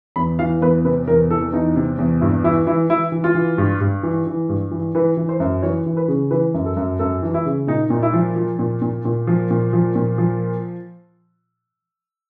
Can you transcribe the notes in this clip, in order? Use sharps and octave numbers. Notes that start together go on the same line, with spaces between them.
E2 B5
E3 F5
E2 B4
C3 B4
E2 A#4
E3 A4
E2 D#4
C3
E2
G2 E4
E3 E4
E3 E4
E3 E4
E3
F4
E3
G2
G2
E3
E3
G2
E3
E3 B4
E3
C5
F#2
E3 C#5
E3
B4
C#3
E3 B4
F#2
A4
F#2
F#2 A4
E3
E4
C#3
A#2 D#4
A#2 D#4
E4
F3
F3
A#2
A#2
A#2
F3
A#2
F3
A#2
F3